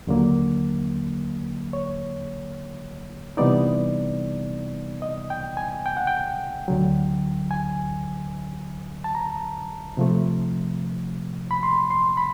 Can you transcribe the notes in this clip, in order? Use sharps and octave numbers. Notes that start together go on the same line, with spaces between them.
D#2 D3 F#3 A#3
C#5
C3 E3 G3 B3 D#4 D5
D#5
G5
G#5
G5
F#5
G5
D2 D3 F#3
G#5
A5
A#5
C3 F3 A3
B5
C6
C6
B5